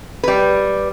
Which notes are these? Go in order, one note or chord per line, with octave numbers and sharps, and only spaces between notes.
G3 B4